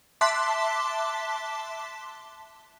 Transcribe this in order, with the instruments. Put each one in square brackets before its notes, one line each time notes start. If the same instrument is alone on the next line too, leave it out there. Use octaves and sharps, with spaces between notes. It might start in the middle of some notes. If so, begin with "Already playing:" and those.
[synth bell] E5 A5 C6 D6 F#6 B6